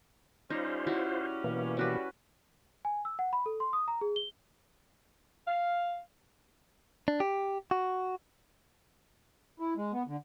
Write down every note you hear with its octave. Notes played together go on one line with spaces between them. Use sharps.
G3 C#4 D#4 F4 C5
E4 F#4 C#5
B2 E3 A#3
G3 C#4 F#4 B4
G#5
E6
F#5
B5
A4
C6
D#6
A#5
G#4
G7
F5
D4
G4
F#4
E4
G#3
B3
D3